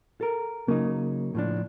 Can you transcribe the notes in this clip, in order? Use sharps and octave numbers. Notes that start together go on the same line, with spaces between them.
A4 A#4
C#3 F#3 A#3 D#4
A2 F3 D4